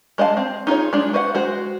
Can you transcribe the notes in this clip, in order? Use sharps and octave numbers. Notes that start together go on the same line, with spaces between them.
G#3 D#5 F5 A5
C4
D#4 F4 G#4 C#5
G#3 D4
F#4 B4 C5 D#5 F#5
G#3 F#4 C5